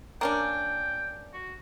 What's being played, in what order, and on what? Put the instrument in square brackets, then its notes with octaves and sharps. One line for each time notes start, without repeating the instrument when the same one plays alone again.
[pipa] A#3 C#4 D4 [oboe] G5
[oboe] F#4